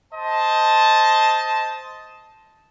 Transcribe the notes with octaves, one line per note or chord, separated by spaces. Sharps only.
C5 D#5 A5